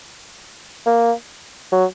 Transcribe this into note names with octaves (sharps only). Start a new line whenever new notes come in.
A#3
F#3